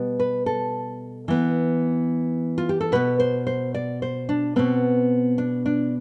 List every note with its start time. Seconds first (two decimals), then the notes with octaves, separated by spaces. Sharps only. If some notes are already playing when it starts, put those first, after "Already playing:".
Already playing: B2 G3 B3
0.20 B4
0.46 A4
1.28 E3 B3
2.58 F4
2.69 G4
2.81 A4
2.92 B2 B3 B4
3.20 C5
3.47 C5
3.74 D5
4.02 C5
4.29 D4
4.56 B2 B3 C4
5.38 D4
5.66 D4